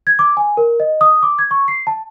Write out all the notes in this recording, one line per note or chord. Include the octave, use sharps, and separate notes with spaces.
G#6
D6
G#5
A#4
D#5
D#6
D6
G#6
C#6
C7
A5